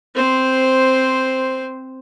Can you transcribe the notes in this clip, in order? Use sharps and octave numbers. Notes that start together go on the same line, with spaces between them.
C4 C5